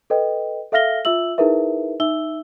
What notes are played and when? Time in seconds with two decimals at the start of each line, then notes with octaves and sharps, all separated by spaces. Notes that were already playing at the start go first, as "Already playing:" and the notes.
0.10 A4 B4 D#5 G5
0.72 A4 E5 F5 F6 A#6 G7
1.05 F4 E5 E6 F#7
1.38 D#4 E4 G#4 A#4 B4 E5
2.00 D#4 E5 E6 G7